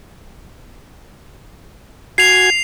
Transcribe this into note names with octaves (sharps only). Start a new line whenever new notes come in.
F#4 G#5 G#6 C7 F7